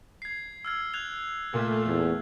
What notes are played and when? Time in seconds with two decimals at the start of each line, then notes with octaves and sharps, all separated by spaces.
0.22 G#6 C7
0.65 E6 F6 G#6
0.94 F#6 G#6 F7
1.54 A#2 A3
1.86 E2